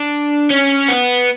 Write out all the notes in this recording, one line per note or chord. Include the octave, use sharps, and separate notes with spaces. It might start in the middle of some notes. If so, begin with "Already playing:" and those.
Already playing: D4
C#4
B3